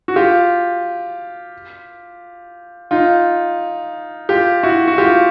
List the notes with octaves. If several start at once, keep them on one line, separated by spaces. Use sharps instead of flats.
F#4
F4 G4
D#4 F4
F4 G4
E4 F#4
F#4
F4 G4